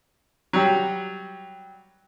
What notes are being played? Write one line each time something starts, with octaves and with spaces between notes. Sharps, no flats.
F#3 G3